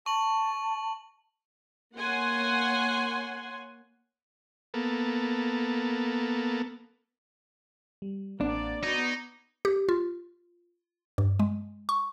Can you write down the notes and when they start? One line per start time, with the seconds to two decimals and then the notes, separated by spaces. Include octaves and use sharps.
0.06 A5 C#6 F#7
1.96 A#3 C#5 F#5 G#5 C6
4.74 A#3 B3 A4
8.02 G3
8.41 A1 A#3 C4 D4 D5 F#5
8.84 B3 D#4 F#4 D5 G#6
9.65 G4
9.89 F4
11.18 G2
11.40 G#3
11.89 C#6